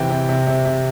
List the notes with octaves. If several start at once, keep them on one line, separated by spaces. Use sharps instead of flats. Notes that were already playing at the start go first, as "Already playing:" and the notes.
Already playing: C3 E3 G5
C3
C3
C3
C3